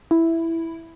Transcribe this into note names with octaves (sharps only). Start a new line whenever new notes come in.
E4